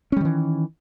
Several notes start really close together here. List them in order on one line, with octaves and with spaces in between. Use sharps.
C#4 G3 D#3 E3